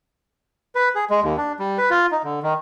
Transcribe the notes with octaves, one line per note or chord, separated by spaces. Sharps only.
B4
G#4
G#3
D#2
D4
G3
B4
F4
D#4
D3
D#3